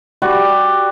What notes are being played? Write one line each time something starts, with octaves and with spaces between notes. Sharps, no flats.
G3 F#4 D5